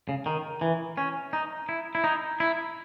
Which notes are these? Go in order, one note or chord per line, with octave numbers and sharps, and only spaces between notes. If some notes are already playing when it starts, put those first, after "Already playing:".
C#3
D#3
E3
C#4
D#4
E4
E4
D#4
E4